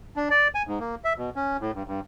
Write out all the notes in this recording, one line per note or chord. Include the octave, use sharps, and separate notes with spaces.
D4
D5
G#5
G#2
A#3
E5
B2
C#4
A2
G2
G2